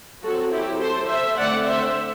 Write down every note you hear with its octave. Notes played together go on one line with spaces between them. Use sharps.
F#3 C4 F#4 A4
E4 G4
A4 C5
C5 E5
D3 A3 C4 D5 F#5
C5 E5